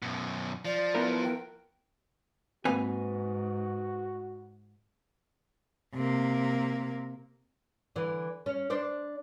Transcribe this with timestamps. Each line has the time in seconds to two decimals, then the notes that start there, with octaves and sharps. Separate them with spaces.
0.02 F#2 B2
0.65 F3 D5
0.95 B3 E4 A#4
1.24 G5
2.65 G#2 A#3 C4 F#4 B4 G#5
5.95 C3 A#3
7.96 D3 E3
8.46 C#4
8.70 D4 C5 D5